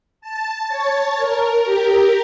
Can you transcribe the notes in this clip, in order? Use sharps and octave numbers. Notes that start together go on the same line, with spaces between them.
A5
C#5
A#4
G4